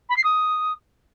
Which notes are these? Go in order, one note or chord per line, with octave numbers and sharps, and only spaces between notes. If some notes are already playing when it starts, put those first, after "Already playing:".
B5
C7
D#6